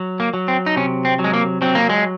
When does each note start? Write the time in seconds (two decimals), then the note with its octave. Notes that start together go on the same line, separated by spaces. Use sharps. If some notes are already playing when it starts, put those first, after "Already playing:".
Already playing: F#3
0.20 A#3
0.34 F#3
0.48 C4
0.66 D#4
0.76 C3 C#4
1.05 C4
1.19 F#3
1.24 G#3
1.33 A#3
1.62 F#3 C4
1.75 A#3
1.90 G#3